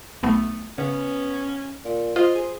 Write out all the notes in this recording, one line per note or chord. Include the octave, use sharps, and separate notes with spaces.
B1 A3 B3
C#3 B3 C#4
A#2
F4 C5 D#5
G#4